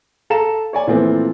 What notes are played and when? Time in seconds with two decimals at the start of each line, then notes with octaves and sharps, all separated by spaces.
0.30 A4 F5 A#5 E7
0.73 C#5 D5 G#5
0.87 A#2 E3 F3 A3 B3 C4